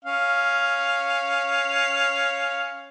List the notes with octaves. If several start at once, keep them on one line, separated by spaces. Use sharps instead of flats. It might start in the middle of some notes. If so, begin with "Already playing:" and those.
C#4 F5